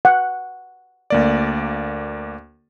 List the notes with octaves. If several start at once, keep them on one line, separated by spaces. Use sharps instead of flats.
F#5
D2 A#3 D5